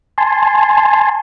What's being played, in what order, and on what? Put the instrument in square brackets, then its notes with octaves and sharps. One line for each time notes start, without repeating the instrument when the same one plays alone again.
[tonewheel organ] G#5 A5 C6